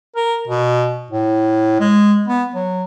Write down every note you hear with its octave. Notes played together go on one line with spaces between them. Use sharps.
A#4
B2
A2
G#3
B3
F#3